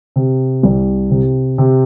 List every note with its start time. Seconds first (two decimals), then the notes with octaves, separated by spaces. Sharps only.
0.16 C3
0.63 C2
1.11 C3
1.58 C3